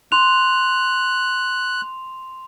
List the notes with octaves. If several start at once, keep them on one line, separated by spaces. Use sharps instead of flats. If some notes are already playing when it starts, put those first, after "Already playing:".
C6 F#6 F7